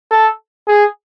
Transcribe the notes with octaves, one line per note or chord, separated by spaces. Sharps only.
A4
G#4